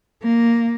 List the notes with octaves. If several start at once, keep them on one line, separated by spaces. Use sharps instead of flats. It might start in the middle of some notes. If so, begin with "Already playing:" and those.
A#3